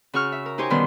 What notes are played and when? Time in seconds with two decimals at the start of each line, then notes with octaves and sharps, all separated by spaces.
0.13 C#3 F#4 C#6 F6
0.32 E5
0.46 A#4
0.58 D#4 G4 C5 C#5 G#5
0.70 B2 D3 D#3 G3 B3 C6